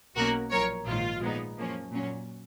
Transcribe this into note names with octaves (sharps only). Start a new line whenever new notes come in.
B1 B2 A#3 C#4 F#4 A#4
A#1 A#2 F#3 A#4 C#5
A#1 G#2 D#3 F4
A#2 F3 G#3 B3 D#4
F#2 F3 A#3 C#4
A#2 F#3 C#4